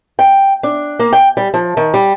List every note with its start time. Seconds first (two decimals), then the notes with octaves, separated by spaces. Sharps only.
0.19 G5
0.63 D4
0.99 A#3
1.13 G5
1.37 G3
1.54 F3
1.77 D#3
1.94 G3